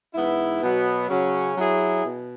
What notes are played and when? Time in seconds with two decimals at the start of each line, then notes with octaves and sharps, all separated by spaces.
0.14 G#2 E3 B3 E4
0.63 B2 F#3 B3
1.10 C#3 F#3 C#4
1.57 F#3 E4 G#4
2.06 B2